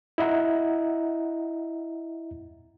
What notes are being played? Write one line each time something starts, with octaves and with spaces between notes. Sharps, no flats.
E4 D#5 E5 F#5 A#5